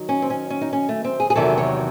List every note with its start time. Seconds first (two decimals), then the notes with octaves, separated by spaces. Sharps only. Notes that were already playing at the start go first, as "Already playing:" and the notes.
Already playing: D#3 F#3
0.09 C#4
0.22 C4
0.30 C#4
0.50 C#4
0.61 D#4
0.73 C#4
0.89 A3
1.04 C4
1.20 G#4
1.30 G#4
1.35 E2 C3 D#3 F#3 A4
1.58 C#5